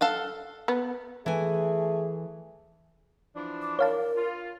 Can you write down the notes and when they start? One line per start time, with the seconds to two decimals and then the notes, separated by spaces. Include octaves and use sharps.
0.01 A4 F5 F#5
0.68 B3
1.26 E3 A3 G#4 G#5
3.35 E3 F3 D4
3.62 D6
3.79 A#4 C#5 F5 A5
4.15 F4